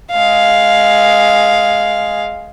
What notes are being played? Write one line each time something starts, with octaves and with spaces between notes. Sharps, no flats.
G#3 F5